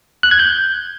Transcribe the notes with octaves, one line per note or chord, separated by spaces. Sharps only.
F#6
G#6
G6